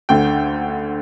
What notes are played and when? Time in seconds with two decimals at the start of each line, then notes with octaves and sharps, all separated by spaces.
0.09 D2 D3 G5